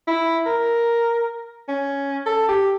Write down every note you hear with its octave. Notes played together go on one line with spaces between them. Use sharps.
E4
A#4
C#4
A4
G4